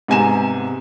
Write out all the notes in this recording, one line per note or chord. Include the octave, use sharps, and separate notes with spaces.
G#2 C3 B3 G#5 A#5 E7